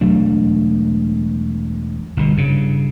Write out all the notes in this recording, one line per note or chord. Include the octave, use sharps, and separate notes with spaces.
E1 F#3 A3 D4
G1 B2
G2 C#3